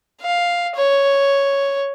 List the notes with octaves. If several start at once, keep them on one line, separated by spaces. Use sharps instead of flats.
F5
C#5